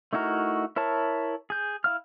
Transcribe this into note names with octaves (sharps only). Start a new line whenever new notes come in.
A3 D#4 E4 F#4 A#4
E4 A#4 C#5 A5
G#4 G6
E4 F5 F6